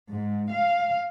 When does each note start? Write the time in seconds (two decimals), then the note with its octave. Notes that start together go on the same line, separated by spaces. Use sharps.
0.13 G#2
0.52 F5